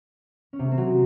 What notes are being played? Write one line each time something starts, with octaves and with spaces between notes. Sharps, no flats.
C#4
C3
A3
C4
F#3